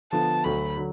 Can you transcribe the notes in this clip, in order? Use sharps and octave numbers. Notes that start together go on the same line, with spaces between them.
D3 F3 B3 A5
D2 D3 F#3 B5
D3 F#3